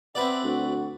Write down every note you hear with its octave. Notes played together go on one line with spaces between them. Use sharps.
B3 C4 B4 D5 E5
D2 F#4